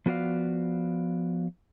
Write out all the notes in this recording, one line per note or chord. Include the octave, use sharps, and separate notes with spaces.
F3 B3 F#4 D5 F5